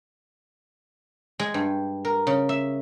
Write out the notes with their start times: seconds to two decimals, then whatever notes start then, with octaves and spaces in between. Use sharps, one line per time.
1.39 G#3
1.54 G2
2.05 A#4
2.27 C#3
2.49 E5